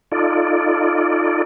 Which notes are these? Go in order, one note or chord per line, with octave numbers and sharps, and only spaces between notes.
D#4 F4 A4 D5